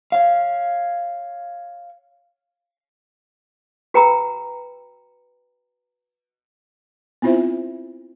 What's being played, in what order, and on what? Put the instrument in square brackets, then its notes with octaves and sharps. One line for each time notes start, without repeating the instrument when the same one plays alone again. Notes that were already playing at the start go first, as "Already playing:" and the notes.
[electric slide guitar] C#5 F5
[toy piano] F#4 B4 G5 A#5 B5 E6
[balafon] B3 C4 E4 F4 C5 E5